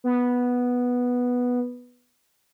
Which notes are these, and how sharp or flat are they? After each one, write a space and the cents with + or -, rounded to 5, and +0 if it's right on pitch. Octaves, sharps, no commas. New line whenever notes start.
B3 -5